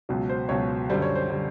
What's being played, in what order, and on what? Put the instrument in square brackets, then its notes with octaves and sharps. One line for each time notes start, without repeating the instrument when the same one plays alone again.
[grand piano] C#2 B2 F#3
C5
C#2 B2 F#3 C#5
F#2 D3 G3 C5
C#5
C5
D3 G3